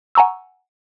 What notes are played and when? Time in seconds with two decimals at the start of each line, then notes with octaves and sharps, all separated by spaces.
0.15 F#5 G#5 A#5 C#6 E6